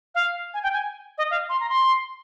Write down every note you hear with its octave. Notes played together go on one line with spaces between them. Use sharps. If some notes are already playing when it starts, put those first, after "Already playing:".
F5
G#5
G5
G#5
D#5
F5
C6
A#5
C6